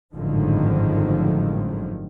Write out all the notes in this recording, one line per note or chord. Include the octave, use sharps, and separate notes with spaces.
G#1 F#2 A2 D3 D#3 F3